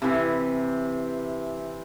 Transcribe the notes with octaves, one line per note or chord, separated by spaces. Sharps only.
C3 E3